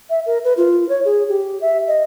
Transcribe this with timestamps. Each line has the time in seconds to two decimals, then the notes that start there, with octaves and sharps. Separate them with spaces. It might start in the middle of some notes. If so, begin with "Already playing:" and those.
0.10 E5
0.26 A#4
0.44 B4
0.57 F4
0.89 C#5
1.05 G#4
1.29 G4
1.62 E5
1.88 D#5